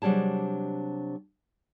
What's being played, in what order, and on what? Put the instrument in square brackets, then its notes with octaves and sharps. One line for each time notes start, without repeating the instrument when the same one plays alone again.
[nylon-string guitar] C3 F#3 G3 D4 G#4 A5